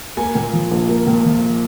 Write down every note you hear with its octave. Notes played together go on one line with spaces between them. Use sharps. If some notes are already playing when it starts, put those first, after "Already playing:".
A#3 G#5
A#2
F3
A#1
A#3
A#2
F3